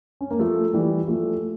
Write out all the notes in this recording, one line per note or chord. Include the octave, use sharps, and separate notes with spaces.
C#4
A#3
F3 A3
E3 G3
F3 A3